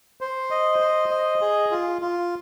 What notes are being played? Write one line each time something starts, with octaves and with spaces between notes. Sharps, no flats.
C5
D#5
C5
D#5
G#4
F4
F4